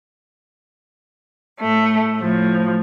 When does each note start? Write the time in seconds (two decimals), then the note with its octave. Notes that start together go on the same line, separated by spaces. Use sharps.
1.61 A2 A3
2.19 A2 F3